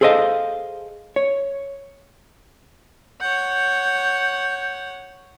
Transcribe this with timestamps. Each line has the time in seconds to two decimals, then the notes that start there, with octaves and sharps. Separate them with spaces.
0.01 G#4 A4 C5 D5 D#5 F5
1.16 C#5
3.21 C#5 F#5 G6